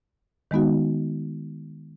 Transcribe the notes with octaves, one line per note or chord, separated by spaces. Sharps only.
D#3 G#3 B3 D#4 F#4